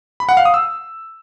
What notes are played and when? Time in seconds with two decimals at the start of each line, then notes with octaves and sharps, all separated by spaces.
0.20 B5
0.29 F#5
0.37 F5
0.45 D#6
0.54 E6